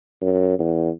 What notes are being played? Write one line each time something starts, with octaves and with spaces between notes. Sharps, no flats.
F#2
E2